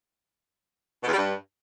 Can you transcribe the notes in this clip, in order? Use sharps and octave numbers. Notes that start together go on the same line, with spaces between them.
B2
E2
G3
G2